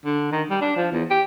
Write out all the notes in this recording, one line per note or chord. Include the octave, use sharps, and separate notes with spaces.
D3
D#3
G3
D4
F3
E2
G4